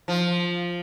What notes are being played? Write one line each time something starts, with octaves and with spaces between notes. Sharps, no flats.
F3